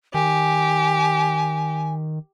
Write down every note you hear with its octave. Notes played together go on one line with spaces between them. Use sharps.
D#3 G4 G#5